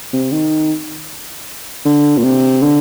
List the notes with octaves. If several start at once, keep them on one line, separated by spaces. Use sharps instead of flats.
C3
D#3
D3
A#2
C3
D3